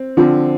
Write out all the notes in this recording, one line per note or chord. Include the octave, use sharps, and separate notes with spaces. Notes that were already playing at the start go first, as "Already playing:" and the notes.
Already playing: C4
D3 F3 C4